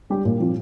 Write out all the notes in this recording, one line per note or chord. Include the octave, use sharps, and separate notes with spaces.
G3 D4 G4
A#2
F3 C4 F4